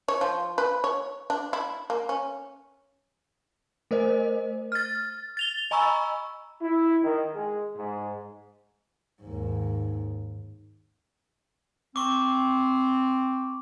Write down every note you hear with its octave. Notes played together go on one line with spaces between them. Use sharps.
C#5
F3
B4
C#5
D4
E4
A#3
C#4
A3 A#4 C5 D#5
F6 A6
A6 F7 G7
D#5 G#5 A#5 B5 C#6 E6
E4
D#3
G#3
G#2
D#2 G#2
C4 C#6 D6